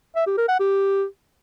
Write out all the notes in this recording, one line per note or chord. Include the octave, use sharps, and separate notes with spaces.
E5
G4
A#4
F#5
G4